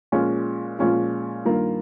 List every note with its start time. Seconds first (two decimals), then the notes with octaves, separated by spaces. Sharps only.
0.12 A#2 F3 G#3 C#4 F4
0.79 A#2 F3 G#3 C#4 F4
1.45 G2 D#3 A#3 F4